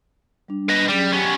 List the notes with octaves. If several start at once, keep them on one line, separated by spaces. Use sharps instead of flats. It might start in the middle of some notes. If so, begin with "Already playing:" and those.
G3 D4
B4 D#5
F#3 G3 C#4 G#4
B3 C#4 G4 G5